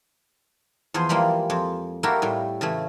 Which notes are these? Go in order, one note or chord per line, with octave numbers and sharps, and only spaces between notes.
E2 F3 G#4 C5
E3 F3 G3 G#3 A#3
F2
A#3 E4 F#4 G4 A4 A#4
A2 G3
C#3 E3 A3